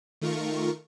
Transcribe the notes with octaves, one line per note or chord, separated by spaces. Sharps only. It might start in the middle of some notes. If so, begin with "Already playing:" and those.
D#3 A3 F4 A#4 C#6